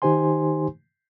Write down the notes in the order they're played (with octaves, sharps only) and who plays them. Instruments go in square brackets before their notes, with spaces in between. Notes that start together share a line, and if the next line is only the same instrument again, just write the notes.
[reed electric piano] D#3 D#4 G4 C5 G#5 C6